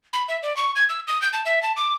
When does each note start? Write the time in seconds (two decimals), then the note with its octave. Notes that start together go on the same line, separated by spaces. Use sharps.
0.13 B5
0.28 E5
0.43 D5
0.57 C#6
0.76 G#6
0.89 E6
1.07 D#6
1.22 G6
1.33 A5
1.45 E5
1.63 A5
1.76 D6